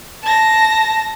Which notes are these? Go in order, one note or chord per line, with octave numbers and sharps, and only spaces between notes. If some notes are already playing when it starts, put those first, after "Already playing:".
A5 A#6